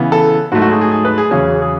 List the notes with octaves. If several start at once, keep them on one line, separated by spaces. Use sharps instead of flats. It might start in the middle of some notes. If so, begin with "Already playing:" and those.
Already playing: C#3 E3 B3
A4
G#2 F#3 A3 F#4
F#4
G#4
G#4
G#4
B4
G#4
E2 C#3 F#3 C#4 G#4
G#4